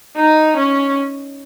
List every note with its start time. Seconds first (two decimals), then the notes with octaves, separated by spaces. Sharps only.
0.16 D#4
0.56 C#4